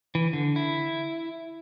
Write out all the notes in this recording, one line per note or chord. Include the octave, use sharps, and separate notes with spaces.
E3
D3
E4